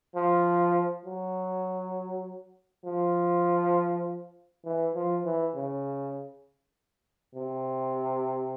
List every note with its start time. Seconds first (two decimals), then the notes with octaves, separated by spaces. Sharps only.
0.16 F3
1.05 F#3
2.85 F3
4.65 E3
4.95 F3
5.25 E3
5.55 C#3
7.35 C3